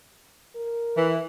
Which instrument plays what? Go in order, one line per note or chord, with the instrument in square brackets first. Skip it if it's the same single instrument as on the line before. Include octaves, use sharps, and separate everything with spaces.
[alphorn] A#4
[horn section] E3